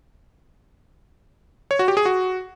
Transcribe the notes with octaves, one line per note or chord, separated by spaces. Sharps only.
C#5
F#4
G4
G#4
F#4